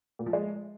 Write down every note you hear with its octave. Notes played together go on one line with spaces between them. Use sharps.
A#2
F3
G#3